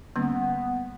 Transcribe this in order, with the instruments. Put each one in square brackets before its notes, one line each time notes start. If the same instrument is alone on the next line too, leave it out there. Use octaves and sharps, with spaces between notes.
[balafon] D3 G3 A#3 C#4 [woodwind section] B3